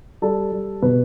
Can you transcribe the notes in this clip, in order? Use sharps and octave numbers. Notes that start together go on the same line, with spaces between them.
G3 A4
G3
B2 B4